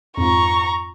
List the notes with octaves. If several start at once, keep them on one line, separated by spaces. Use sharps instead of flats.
F2 G#2 F4 A#5 C#6